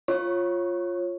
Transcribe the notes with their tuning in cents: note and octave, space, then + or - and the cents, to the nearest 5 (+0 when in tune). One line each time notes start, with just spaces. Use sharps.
F4 +0 C#5 -20 C#6 +0